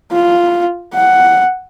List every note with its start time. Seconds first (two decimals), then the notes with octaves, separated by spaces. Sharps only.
0.12 F4
0.95 F#5